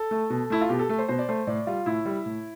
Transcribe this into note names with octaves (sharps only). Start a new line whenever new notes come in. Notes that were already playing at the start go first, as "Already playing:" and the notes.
Already playing: A4
A3
B2
A3 E4
F4
B2 G4
A4
A3 A4
C5
B2 C5
D5
A3 C5
A2 D5
G3 F4
A2 E4
G3
A2